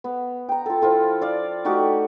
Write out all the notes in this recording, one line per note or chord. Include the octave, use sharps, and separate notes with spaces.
B3
G5 A#5
F4 A4
F3 E4 F4 A4
D5 F5
A3 D#4 F#4 G4